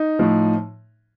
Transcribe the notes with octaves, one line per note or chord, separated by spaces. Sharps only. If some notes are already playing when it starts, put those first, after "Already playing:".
Already playing: D#4
A2 F3